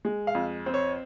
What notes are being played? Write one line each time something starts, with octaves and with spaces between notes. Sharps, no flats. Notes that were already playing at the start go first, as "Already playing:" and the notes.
G#3
F5
F2
C4
C#5